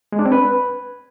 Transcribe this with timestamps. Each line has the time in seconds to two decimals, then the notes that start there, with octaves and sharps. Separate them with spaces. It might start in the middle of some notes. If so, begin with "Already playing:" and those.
0.12 G#3
0.19 D4
0.25 C4
0.32 B4